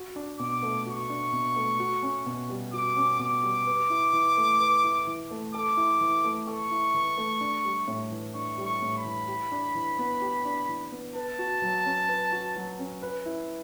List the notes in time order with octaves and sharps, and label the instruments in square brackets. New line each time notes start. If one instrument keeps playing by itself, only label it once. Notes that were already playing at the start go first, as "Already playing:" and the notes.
Already playing: [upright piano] F#4
D4
[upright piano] B2 [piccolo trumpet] D6
[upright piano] A3
[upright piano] F#4 [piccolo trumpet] C#6
[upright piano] D4
B2
A3
F#4
C#4
B2
G3
[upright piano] F#4 [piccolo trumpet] D6
[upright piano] C#4
[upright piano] B2 [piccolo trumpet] D6
[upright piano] G3
B4
E4
E3
A3
B4
E4
E3
A3
[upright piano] A4 [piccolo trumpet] D6
[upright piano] E4
E3
A3
[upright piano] A4 [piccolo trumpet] C#6
[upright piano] E4
E3
A3
D4
G3
A2
E3
[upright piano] D4 [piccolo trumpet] C#6
[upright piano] G3
[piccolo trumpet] C#6
[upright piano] A2
[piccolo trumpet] B5
[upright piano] E3
G4
D4
E3
B3
G4
D4
E3
B3
[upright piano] B4 [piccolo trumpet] A5
[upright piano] F#4
F#3
C#4
B4
F#4
F#3
C#4
B4
E4